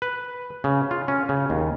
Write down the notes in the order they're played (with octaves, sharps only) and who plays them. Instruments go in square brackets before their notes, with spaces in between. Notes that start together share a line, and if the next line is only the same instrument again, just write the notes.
[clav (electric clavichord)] B4
C#3
F4
C#4
C#3
D#2